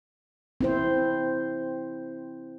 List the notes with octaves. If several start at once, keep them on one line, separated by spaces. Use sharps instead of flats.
C4 E4 C5